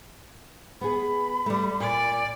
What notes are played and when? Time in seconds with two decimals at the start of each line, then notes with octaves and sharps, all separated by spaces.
0.81 B3 G#4 B5
1.46 G3 A3
1.80 A#2 D5